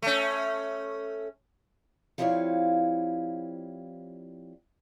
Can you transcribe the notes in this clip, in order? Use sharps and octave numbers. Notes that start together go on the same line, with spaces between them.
A3 C#4
F3 G3 C4 E4 C#5 F5